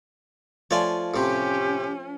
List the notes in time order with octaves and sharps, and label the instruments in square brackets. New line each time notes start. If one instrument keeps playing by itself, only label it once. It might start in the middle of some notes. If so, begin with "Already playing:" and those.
[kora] F3 A3 F4 [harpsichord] C#5 D5 G#5
[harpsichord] A2 C3 [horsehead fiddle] C#4 [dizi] G4